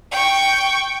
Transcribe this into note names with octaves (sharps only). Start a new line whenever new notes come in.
G5 C#6